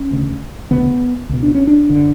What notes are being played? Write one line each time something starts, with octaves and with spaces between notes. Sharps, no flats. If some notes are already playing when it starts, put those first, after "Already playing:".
Already playing: C#4
E1 D2 C#3
E1 D2 C#3 B3
C#2 B2
D4
C#4
D4
F#1 D3